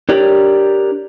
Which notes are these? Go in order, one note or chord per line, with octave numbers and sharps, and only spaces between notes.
D4 G4 A#4 C#5 D5